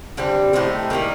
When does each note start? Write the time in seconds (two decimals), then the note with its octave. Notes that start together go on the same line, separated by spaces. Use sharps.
0.17 D3 G3 C4 G4
0.53 A2 A3 C4 D#4
0.90 D#3 G3 A#3 D#4